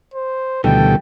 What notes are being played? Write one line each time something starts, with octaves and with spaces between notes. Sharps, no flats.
C5
D2 B2 D#3 E3 G3 A4 G5